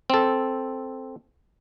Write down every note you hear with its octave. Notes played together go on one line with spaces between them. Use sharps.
C4 A4